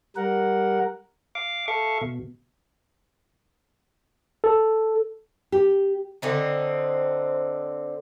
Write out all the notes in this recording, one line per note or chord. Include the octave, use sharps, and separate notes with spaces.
G3 A#4 F#5
F5 D6
A4 E5 F5 C#6
B2
A4
G4
D3 C4 D#4